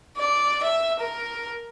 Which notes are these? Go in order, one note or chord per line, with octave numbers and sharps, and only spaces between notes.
D5
E5
A#4